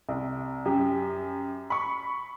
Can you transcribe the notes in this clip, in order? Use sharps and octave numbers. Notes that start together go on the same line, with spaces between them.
C2
F#2 G4
B5 C#6